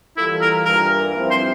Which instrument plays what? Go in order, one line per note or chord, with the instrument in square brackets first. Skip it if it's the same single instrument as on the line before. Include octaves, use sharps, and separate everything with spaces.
[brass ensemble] E3 G3 A#3 F4 A4 [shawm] E4
[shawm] A#4
[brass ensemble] G2 E3 G3 A#3 F4 [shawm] A#4
[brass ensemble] G2 F3 C4 E4
[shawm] C5